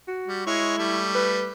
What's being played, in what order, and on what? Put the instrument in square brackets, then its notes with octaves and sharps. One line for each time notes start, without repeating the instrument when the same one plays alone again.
[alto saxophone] F#4
[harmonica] G3
[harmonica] G#3 C#5 [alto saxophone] E4
[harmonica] G3 A3
[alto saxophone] B4